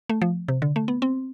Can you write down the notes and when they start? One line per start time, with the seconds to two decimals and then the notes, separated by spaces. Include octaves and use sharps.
0.09 A3
0.22 F3
0.48 C3
0.62 D3
0.76 A3
0.88 B3
1.02 C4